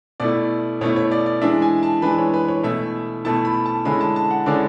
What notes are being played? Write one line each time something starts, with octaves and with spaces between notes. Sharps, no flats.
B2 A3 E4 D5
B2 A3 E4 C#5
C#5
D5
D5
E3 G#3 D4 E5
G#5
A5
E3 G#3 D4 B4
C#5
B4
C#5
B2 A3 E4 E5
B2 A3 E4 A5
B5
A5
D3 G#3 C#4 E4 B5
A5
A5
F#5
D3 G#3 C#4 E4 D5